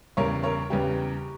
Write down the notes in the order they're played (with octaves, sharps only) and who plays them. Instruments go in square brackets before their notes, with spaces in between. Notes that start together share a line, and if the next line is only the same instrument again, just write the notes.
[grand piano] E2 C#3 G3 [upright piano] A#4 C#5
[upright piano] A#4 C#5
[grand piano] E2 C#3 G3 [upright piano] G4 B4